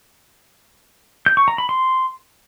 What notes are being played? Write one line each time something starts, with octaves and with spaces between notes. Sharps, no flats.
G6
C#6
A#5
B5
C6